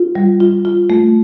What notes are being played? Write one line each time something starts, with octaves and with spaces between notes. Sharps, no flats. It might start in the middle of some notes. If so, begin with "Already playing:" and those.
Already playing: F4
G3
F4
F4
A3